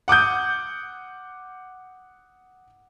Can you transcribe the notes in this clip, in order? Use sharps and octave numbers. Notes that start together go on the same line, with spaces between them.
F#5 D6 D#6 G6